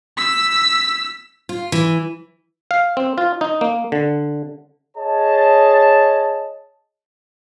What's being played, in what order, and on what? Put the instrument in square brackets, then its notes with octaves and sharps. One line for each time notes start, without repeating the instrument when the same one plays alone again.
[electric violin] E6 B6
[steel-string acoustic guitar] F4
E3
[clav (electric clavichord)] F5
C4
F4
D#4
A#3
D3
[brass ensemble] G#4 C#5 D#5 A5